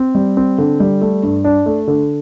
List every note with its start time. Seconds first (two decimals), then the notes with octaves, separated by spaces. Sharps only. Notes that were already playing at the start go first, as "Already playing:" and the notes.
Already playing: C4
0.15 G3
0.37 C4
0.58 D3
0.80 G3
1.01 A3
1.23 G2
1.44 D4
1.66 A3
1.87 D3